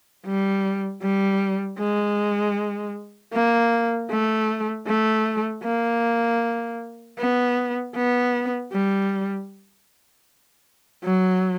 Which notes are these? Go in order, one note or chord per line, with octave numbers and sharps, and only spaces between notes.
G3
G3
G#3
A#3
A3
A3
A#3
B3
B3
G3
F#3